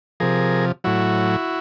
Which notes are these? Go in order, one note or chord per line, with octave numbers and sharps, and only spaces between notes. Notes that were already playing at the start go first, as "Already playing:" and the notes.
C3 F3 G#4 A#4
A2 F#3 E4 F#4